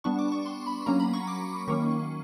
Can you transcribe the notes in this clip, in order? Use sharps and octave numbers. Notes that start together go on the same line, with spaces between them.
G3 B3 D4 C#6
D6
C#6
C6
B5
F#3 A#3 C#4 A#5
B5
C#6
D6
D#3 F#3 A#3 C#4 C#6